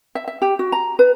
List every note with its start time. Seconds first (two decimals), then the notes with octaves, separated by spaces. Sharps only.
0.15 E5
0.28 E5
0.42 G4
0.59 F#4
0.72 A#5
0.99 B4